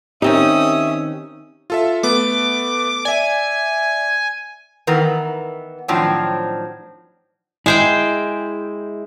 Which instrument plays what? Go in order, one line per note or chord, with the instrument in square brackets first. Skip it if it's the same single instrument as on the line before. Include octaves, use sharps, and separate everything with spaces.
[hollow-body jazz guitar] D#3 C4 D#4 [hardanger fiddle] C#4 D#6 [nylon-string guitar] G4 D#5 [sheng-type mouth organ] E5
[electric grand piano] F4 A4 E5
[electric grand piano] A3 B3 [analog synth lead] D6
[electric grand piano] D5 E5 [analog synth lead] G#5
[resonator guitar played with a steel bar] D#3 E3 B3 A#4
A2 D#3 F3 F#3 C4 D4
[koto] G#3 C5 G5 [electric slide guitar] E4 G#4